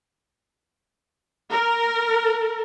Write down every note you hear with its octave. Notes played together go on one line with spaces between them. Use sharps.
A#4